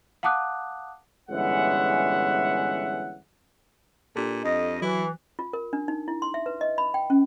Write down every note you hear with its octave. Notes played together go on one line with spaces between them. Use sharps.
F5 F#5 A5 D6 D#6 F#6
G1 E3 G#3 C#4 E5 F#5
A#2 D4 G4 A4
F2 D#5
E3 F#3 E4
F4
A#4
D4
D#4
E4
C6
E5
B4
D#5
B5
G5
C#4